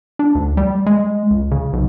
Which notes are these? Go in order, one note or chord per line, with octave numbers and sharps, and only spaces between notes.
D4
D2
G3
G#3
C#2
C#3
B1